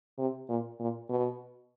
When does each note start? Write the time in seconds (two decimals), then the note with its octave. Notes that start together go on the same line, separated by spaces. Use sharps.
0.18 C3
0.49 A#2
0.80 A#2
1.09 B2